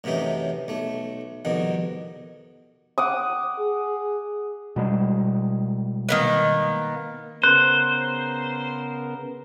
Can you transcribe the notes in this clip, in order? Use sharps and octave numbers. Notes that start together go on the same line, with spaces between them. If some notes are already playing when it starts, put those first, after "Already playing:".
F#2 A2 C3 E3 D#4
B1 A3
C2 F2 B2 D#3
F#5 D6 D#6
G#4
B2 G3 G#3
D#3 A#3 B3
C#3 B3 A#4 C5 F#6